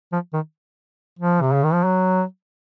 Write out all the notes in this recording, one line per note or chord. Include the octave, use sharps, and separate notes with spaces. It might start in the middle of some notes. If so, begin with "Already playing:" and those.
F3
D#3
F3
C3
C#3
D#3
F3
F#3